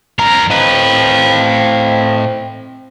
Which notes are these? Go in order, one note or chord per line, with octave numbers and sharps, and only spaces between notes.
C2 F2 A#4 A#5
A2 C4 B4 D#5 F5